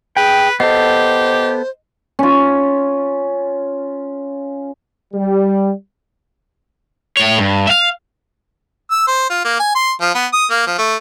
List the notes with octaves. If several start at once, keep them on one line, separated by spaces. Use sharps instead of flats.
G#4 B4 G5
B3 G4 A4 C5 D#5 C7
C#4 F4
G3
A2 C#5
G2
E5 F5
E6
C5
F4
A#3
G#5
C6
F3
B3
D#6
A#3
F3
A3